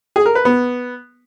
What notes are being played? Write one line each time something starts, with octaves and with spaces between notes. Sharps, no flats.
G#4
A#4
B4
B3